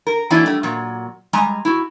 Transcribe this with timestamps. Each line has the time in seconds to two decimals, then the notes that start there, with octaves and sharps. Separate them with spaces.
0.07 A#4
0.30 E3 F#3 A#3 D4 E4
0.46 G3 A3
0.63 A#2 F#3
1.33 G3 G#3 G#5 A#5
1.65 E4 F#4